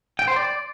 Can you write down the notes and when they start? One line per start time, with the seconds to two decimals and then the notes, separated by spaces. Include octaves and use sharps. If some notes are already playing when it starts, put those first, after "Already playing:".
0.19 G5
0.28 C5
0.36 D5